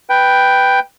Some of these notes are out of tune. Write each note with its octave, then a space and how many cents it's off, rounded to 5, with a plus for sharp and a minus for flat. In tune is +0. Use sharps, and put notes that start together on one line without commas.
B4 +0 G5 +0